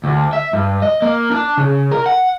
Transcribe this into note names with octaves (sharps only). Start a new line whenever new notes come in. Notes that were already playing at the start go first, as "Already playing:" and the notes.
D2
E5
G2
D#5
A#3
D4
C#3
A#4
F#5